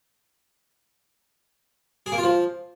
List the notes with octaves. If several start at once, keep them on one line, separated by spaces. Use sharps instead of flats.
G#4
A#3
F4
F3